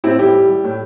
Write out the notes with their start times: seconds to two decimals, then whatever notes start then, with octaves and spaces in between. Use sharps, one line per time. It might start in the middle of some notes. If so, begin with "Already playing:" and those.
0.04 A2 C4 E4
0.19 G3 E4 G4
0.35 G3
0.49 G3
0.64 A2